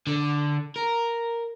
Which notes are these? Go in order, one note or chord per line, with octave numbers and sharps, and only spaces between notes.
D3
A#4